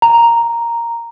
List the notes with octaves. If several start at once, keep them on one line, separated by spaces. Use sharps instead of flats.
A#5